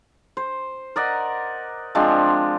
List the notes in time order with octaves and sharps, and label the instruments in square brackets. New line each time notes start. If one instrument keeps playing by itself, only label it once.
[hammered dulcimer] C5
A#4 D5 D#5 F#5
F3 G#3 C4 D4